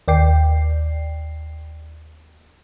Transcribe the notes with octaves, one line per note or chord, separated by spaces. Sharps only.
D#2 D5 G5 C7